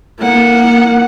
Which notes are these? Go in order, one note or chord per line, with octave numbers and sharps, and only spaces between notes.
A#3 F#5